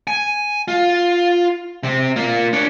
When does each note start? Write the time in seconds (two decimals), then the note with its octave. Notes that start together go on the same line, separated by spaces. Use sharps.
0.07 G#5
0.68 F4
1.83 C3 C4
2.16 A#3 F4
2.53 D4 C#5